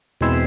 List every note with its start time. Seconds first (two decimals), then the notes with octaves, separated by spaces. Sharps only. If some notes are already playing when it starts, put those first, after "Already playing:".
0.21 E2 B2 G#3 C4 E4